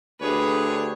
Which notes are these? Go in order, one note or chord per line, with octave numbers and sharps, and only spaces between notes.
D2 D4 G4 G#4 B4 C#5